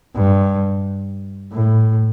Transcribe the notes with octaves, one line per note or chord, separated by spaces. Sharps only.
G2
A2